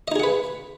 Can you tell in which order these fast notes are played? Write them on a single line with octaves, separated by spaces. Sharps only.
D#5 D#4 G#4 F#5 B4